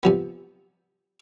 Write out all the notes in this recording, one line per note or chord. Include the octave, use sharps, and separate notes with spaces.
C3 F3 B3